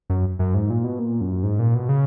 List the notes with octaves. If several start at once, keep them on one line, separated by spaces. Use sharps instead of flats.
F#2
F#2
G#2
A#2
B2
A#2
F#2
G#2
A#2
B2
C#3